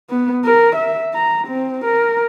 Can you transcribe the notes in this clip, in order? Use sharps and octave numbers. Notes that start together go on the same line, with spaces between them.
B3
A#4
E5
A#5
C4
A#4